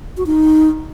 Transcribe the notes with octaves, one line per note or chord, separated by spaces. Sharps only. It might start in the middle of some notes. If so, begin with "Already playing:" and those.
F#4
D#4